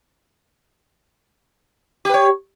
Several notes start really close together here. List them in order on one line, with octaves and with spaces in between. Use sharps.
G4 B4 C#5